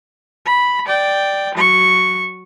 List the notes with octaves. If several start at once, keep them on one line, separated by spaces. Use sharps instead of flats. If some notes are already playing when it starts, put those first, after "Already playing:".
B5
D5 G5
F#3 C#6